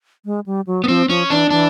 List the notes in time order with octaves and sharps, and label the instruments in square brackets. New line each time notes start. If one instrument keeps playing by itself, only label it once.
[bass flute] G#3
G3
F#3
[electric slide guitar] B3
[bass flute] F3 [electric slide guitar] C4
[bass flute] F3 [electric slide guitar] C#4
[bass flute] E3 [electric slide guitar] D4
[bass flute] E3 [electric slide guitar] D4